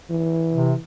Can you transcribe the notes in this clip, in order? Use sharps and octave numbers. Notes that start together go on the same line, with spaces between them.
E3
C3